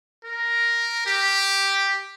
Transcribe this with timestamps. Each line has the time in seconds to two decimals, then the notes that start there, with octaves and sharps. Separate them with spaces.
0.25 A#4
1.06 G4